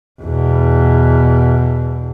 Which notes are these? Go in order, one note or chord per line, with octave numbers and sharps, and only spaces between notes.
E2 B2